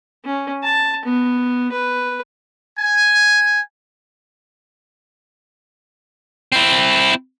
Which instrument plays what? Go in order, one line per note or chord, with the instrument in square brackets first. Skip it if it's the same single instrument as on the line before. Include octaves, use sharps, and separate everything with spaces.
[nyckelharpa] C#4
A5
B3
B4
[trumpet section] G#5
[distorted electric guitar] C4 E4